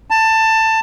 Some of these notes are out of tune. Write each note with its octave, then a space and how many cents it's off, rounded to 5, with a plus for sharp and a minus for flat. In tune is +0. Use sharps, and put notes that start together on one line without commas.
A5 +15